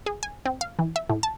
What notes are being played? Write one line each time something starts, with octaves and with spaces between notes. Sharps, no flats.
G#4
G#5
C4
F5
E3
E5
A2
A5